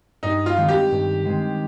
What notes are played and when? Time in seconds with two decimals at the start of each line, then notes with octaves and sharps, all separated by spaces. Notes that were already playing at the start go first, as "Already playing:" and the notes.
0.23 G2 D#4
0.46 F4
0.57 D#3 G#3 C4
0.68 G4
0.91 G2
1.25 D#3 G#3 C4